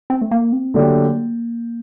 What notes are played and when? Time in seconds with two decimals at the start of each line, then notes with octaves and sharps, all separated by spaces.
0.10 C4
0.21 A3
0.31 A#3
0.52 C4
0.74 D3 F#3 A3 A#3 D4 G4